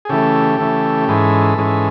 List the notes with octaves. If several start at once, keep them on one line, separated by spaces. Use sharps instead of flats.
G#4
C#3 E3 A3 G4 A4
C#3 E3 A3
G#2 E3 G#3 C#4 A4 B4
G#2 E3 G#3 C#4